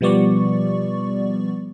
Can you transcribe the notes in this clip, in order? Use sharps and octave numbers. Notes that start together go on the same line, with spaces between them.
B2 F3 G3 B3 D5 C#6